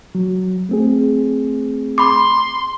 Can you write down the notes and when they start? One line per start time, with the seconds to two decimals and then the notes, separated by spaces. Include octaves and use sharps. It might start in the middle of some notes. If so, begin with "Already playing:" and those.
0.15 F#3
0.69 A3 C4 G#4
1.98 B5 C6 D6